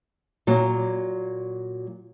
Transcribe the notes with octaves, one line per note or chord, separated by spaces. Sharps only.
A#2 F#3